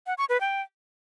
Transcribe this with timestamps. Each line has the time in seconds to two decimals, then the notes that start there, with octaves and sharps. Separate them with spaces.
0.07 F#5
0.18 C#6
0.29 B4
0.41 G5